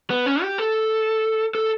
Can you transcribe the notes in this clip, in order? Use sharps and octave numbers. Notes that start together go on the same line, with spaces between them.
B3
C#4
G4
A4
A4